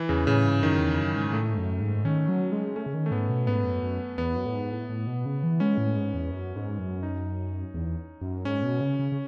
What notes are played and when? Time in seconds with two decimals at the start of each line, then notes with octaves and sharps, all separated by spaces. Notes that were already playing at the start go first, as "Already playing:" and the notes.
Already playing: E3
0.09 E2 C#3
0.27 A2 C#3
0.44 G#2
0.63 F#2 D#3
0.80 E2
0.99 F#2
1.16 G#2
1.33 A2 A3
1.52 G#2
1.58 F#2
1.81 G#2
2.05 D#3 C#4
2.29 F#3
2.52 G#3
2.76 A3 C#4
2.86 C#3
2.94 D#3
3.06 A3
3.11 G#2 B3
3.29 B2
3.47 G#2 B3
3.64 F#2
3.83 F#2
4.18 E2 B3
4.36 F#2
4.46 A2
4.54 G#2
4.72 A2
4.89 A2
5.07 B2
5.26 C#3
5.43 E3
5.60 G#3 C#4
5.78 A2
5.96 G#2
6.14 E2
6.31 F#2
6.56 G#2
6.79 F#2
7.03 D#4
7.74 E2
8.21 F#2
8.45 G#2 C#4
8.63 B2
8.81 C#3
8.99 C#3
9.12 C#3